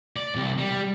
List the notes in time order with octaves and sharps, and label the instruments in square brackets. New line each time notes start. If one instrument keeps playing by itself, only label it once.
[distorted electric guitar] D5
C2
G3